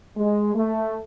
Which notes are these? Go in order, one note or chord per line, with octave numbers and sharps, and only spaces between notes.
G#3
A3